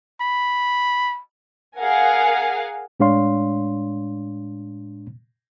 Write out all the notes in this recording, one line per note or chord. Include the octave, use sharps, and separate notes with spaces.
B5
G#4 A#4 F5 F#5 G#5
A2 G#3 D4 C#5 F5 C6